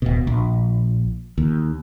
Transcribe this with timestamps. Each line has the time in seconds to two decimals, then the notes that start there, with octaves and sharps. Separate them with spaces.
0.02 D1 B2
0.27 A#1
1.38 D#2